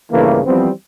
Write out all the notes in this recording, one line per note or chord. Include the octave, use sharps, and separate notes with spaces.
A#1 G2 C#3 E3 A3 A#3
E3 F3 G3 B3 C4